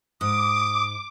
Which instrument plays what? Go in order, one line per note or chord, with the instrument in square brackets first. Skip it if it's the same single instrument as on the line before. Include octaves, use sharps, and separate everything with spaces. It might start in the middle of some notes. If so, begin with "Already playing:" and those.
[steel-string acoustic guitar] G#2 [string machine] D6 [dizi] D#6